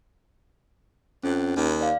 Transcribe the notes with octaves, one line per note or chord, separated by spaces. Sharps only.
F2 C#4
D#2
D5 F5